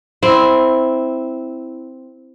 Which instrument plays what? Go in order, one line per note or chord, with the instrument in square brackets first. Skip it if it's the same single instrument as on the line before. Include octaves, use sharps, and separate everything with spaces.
[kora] C4 E4